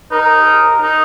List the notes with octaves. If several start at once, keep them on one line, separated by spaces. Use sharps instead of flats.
D#4 A#4
D#4